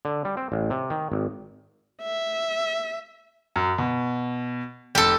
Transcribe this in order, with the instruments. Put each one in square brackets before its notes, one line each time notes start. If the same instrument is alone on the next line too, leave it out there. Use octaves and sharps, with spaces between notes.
[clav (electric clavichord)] D3
G3
C4
A1
C3
D#3
G#1
[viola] E5
[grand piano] F#2
B2
[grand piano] F1 [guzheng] G4 A4